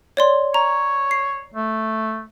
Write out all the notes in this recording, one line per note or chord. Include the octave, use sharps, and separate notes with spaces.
C#5 D5 C6
C#5 A#5
C7
A3